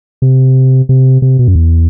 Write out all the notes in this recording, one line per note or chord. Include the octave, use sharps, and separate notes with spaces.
C3
C3
C3
B2
F#2
E2